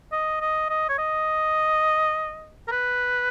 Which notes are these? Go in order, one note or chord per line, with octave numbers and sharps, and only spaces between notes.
D#5
D#5
D#5
C#5
D#5
A#4
B4